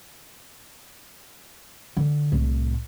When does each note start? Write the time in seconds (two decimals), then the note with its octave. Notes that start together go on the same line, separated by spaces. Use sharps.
1.97 D3
2.32 C2 A2